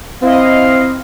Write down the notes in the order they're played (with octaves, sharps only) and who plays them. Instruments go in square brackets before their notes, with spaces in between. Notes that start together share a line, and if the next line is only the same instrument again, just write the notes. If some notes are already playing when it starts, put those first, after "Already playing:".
[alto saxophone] C4 [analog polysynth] E4 D#5 [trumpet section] F5